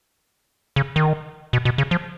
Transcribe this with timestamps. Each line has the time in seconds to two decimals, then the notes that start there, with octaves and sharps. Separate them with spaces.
0.76 C#3
0.96 D#3
1.53 B2
1.65 B2
1.78 C#3
1.91 F3